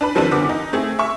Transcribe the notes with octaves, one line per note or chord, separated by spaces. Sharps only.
D4 B4 B5
D#3 F3 G3 C4 D4 B4
F#1 D3 B3 D6
D#4
A3 C4 G#4
E5 C#6